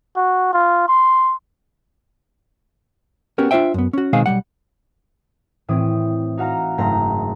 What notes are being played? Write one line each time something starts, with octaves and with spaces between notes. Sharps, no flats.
F#4
F4
C6
B3 C#4 F#4 G4 A#4
D4 F4 A4 C5 E5 G5
F#2 B3
C#4 F#4
B2 D#3 G#3 C4 G#4 F5
B1 G#2 G3 F#5
A2 E3 C4 D#6
D#4 F#4 F5 A#5
F#1 G#2 A3 A#5 C6